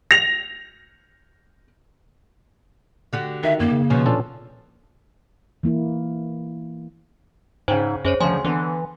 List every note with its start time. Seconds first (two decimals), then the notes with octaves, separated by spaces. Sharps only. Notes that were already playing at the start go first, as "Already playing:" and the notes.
0.11 A#6 F7
3.13 D3 F#4 G4
3.43 D#3 E5
3.60 F#2 A#3
3.71 C#3
3.90 D#2 B2 F3 C#4
4.06 A#2 C#4 D4 A4
5.63 E3 A#3 E4
7.68 G#2 C#3 C5 G5 G#5
8.05 F#2 G#4 C5 C#5
8.21 D2 C#3 F3 G#5 C6
8.44 D3 E3 B3